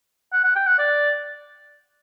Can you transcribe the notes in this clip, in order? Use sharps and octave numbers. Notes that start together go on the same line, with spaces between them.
F#5
F#5
G5
F#5
D5